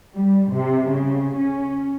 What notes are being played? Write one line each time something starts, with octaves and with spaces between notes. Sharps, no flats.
G3
C3
C#3
C#4